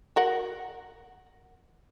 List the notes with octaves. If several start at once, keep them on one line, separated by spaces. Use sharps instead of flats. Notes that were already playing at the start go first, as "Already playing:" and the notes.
F#4 A#4 F#5